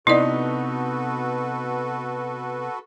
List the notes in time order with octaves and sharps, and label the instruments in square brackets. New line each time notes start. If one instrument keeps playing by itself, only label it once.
[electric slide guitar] C3 B3 [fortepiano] D#4 [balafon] E4 D5 [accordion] F#4 A4 B4